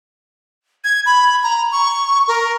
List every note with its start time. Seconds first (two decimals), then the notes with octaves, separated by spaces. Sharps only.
0.84 G#6
1.06 B5
1.43 A#5
1.72 C#6
2.28 A#4